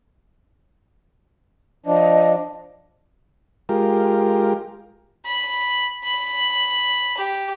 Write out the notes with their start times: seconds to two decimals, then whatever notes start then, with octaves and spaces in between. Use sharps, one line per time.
1.86 F3 D4 D#5
3.69 G#3 F4 G4 A#4
5.25 B5
6.04 B5
7.17 G4